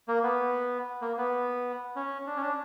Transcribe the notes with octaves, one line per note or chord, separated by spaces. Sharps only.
A#3
B3
A#3
B3
C#4
D4
C#4
D4